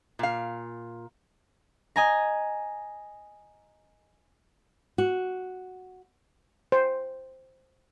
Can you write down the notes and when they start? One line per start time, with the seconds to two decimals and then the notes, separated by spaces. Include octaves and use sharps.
0.19 A#2 F5
1.96 D#5 G#5 A#5
4.98 F#4
6.72 C5